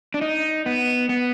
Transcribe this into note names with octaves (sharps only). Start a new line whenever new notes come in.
D4
D#4
B3
B3